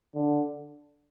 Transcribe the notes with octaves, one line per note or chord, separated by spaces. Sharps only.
D3